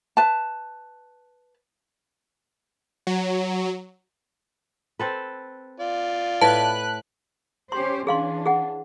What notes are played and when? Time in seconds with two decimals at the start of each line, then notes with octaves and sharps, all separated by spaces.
0.17 B4 A5
3.07 F#3
4.99 C4 A4 B4
5.80 F4 D5
6.41 A2 B4 A5 F#6
7.72 C#4 G4 C5 C6
8.07 E3 C#4 D4 G#4 F5 C6
8.46 G#4 F#5